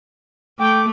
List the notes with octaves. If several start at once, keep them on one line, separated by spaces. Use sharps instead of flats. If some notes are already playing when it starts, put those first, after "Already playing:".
A3 G5 D6